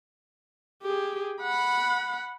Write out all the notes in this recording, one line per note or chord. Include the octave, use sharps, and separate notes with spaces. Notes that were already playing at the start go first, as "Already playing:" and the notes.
G4 G#4
F#5 B5